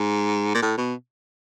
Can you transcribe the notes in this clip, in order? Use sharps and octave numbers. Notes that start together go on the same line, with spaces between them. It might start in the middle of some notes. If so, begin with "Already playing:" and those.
Already playing: G#2
A#2
A2
B2